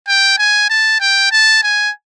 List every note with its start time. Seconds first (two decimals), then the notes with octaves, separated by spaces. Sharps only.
0.08 G5
0.39 G#5
0.69 A5
1.00 G5
1.32 A5
1.63 G#5